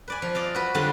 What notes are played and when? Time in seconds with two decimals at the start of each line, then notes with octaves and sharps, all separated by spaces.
0.08 B4 D5 G#5
0.22 F3
0.35 D5 D#5 F5
0.55 F#4 B4
0.75 D3 F#3 G3 F4 F#4